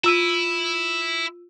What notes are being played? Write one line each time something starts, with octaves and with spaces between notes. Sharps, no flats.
E4 F4 E6 D#7